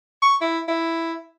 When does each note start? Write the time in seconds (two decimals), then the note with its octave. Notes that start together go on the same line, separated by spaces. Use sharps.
0.22 C#6
0.41 E4
0.68 E4